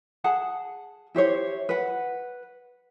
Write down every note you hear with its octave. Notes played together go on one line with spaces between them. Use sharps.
G#4 F#5 A5
E4 G4 C5 C#5
B4 F#5